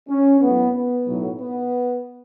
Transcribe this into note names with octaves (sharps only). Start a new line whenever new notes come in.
C#4
A1 A2 F#3 B3
B3
B1 A2 F#3
B3